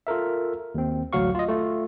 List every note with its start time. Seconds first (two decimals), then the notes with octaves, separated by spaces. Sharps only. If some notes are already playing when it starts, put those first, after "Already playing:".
0.07 F4 A4 A#4 E5
0.75 D#2 C4
1.13 A1 D2 F#3 F#4 F5 C#6
1.35 F4 D#5
1.48 A3 F4